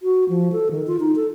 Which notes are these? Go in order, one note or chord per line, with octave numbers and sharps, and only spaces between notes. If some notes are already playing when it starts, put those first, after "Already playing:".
F#4
F3
A4
D#3
F4
D#4
A4